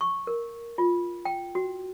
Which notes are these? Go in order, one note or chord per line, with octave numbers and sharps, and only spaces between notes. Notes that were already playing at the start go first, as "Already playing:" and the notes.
C#6
A#4
F4
G5
F#4